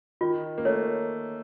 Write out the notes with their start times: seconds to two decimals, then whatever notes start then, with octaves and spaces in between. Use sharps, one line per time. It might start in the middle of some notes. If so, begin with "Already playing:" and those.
0.21 D#3 F4
0.58 A#3
0.65 A3 C#5